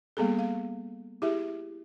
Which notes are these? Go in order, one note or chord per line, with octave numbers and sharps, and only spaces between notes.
G3 A#3 B3 G#4 A4
F5
E4 G4 G#4 E5